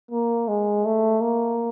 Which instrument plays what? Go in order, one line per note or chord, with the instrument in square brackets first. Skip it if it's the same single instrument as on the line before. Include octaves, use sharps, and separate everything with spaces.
[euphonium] A#3
G#3
A3
A#3